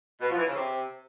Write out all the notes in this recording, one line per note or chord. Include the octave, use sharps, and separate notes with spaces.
B2
F3
E3
C#3
C3